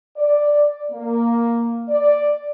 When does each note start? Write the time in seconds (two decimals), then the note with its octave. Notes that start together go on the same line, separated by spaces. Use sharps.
0.16 D5
0.91 A#3
1.88 D5